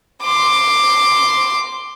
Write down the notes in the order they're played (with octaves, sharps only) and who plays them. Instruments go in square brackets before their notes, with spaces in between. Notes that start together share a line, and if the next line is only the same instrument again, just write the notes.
[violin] C6 D6